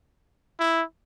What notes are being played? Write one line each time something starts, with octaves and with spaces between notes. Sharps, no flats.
E4